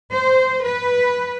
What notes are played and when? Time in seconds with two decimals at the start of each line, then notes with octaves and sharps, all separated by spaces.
0.11 C5
0.64 B4